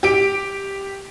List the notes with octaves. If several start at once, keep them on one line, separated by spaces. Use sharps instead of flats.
G4 D7